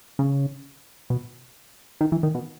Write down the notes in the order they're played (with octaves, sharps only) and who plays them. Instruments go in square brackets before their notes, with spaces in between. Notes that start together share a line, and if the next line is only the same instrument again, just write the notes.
[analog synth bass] C#3
B2
D#3
E3
D#3
B2